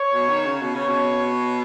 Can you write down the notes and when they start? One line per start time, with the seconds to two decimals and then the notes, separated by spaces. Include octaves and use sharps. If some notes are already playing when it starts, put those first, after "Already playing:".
Already playing: C#5
0.13 B2
0.29 D#3
0.45 C#3
0.61 B2
0.75 C#3 C#5
0.88 B2